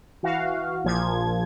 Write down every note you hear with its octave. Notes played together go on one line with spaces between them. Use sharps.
E3 F#4 F5
A#1 A#2 F3 G#6